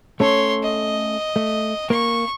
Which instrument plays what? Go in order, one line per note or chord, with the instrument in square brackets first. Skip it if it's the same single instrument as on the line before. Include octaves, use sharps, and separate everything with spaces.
[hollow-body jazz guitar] A3 C#4 A4 [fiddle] C#5 C6
[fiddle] D#5
[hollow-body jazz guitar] A3
[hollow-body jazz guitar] A#3 [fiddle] C#6